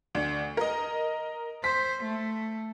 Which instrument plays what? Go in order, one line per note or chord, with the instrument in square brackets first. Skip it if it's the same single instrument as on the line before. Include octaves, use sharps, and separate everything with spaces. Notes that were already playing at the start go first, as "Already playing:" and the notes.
[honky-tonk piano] D2 D4
A#4 D#5
[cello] C5 [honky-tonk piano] B6
[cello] A3